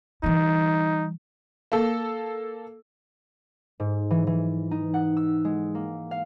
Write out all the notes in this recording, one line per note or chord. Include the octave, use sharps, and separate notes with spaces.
E3 G3 D#4
A#3 A4
G#2
E3
E3
D#4
F#5
E6
G#3
A#3
F5